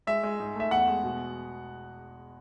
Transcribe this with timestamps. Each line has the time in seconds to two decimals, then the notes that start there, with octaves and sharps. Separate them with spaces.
0.07 G#3 E5
0.23 G#3
0.40 G#2
0.55 A3 E5
0.71 E2 F#5
0.88 G#3
1.04 B2